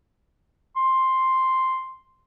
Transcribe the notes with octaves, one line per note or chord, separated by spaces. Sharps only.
C6